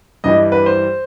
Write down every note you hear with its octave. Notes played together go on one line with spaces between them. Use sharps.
G2 E3 G3 D#5
B4
C5